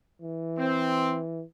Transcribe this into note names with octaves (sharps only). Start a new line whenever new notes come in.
E3
C4